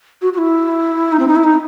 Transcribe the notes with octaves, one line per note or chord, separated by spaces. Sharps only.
F#4
F#4
E4
D#4
C4
D#4
E4
D#4